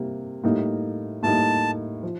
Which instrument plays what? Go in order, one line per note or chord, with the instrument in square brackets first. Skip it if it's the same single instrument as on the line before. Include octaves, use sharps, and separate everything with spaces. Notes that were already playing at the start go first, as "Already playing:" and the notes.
Already playing: [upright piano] C3 G3 A#3
A2 G3 A#3 D#4
[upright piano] A2 G3 A#3 D#4 [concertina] A5
[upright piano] F3